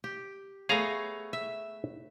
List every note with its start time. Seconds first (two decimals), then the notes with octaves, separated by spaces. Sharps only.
0.04 G4
0.69 A3 B3 G#4 C#5 F5 A#5
1.33 E5